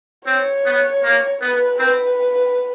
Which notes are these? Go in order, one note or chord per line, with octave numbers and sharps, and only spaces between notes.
C4 C#5
B3
A#3
B3 B4
C4 B4